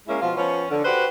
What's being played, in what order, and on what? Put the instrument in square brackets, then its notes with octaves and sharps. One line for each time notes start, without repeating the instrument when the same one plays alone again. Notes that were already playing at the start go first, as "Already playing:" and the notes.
[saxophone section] G#3 A#3 C#4 E4
B2 F3 F4
F3 B3 C#4
D3
F#4 G4 B4 C5